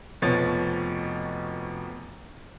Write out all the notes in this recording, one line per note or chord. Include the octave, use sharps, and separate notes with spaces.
F1 B2 F3 C#5 A6